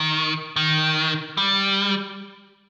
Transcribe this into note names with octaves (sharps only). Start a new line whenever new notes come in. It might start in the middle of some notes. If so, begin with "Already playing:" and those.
Already playing: D#3
D#3
G3